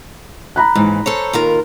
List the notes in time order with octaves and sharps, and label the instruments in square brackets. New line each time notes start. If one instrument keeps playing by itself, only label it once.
[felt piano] A#5 B5 F#6
[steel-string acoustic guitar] D#2 G#2 E3
A4 C5 C#5
D#2 F4 A#4